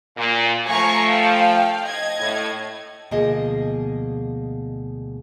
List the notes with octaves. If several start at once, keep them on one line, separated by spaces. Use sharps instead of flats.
A#2
F3 A3 G#5 A#5 C#6
F5 G5
D#5 G#6
A2
D2 B2 F3 A#3 G#4 D#5